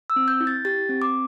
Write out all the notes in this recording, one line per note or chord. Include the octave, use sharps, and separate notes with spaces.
E6
C4
G6
E4
A6
G4 A6
C4
D6